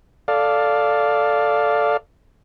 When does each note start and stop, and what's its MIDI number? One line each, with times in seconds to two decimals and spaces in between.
0.28 1.97 69
0.28 1.97 74
0.28 1.97 77